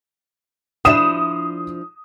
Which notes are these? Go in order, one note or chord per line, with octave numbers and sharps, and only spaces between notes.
F3 D4 E4 D#6 E7